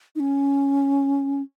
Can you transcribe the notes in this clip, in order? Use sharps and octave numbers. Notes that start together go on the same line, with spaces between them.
D#4
C#4